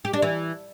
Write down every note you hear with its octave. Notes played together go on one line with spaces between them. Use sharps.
G4
D4
E3